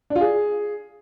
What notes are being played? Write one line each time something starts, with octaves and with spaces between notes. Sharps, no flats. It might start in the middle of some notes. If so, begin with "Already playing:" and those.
D4
F4
G#4